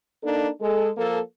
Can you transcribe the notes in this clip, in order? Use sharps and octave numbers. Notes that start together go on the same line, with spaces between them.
A#3 D4 D#4 A4
G#3 A4
F3 A#3 A4